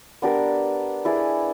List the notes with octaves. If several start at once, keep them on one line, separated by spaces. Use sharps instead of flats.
B3 D4 G4 A#4
E4 G#4 B4 D5